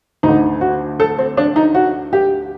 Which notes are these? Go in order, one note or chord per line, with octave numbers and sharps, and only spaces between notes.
D2 D#4
D3
F#4
A4
C4
D4
D#4
F#4
G4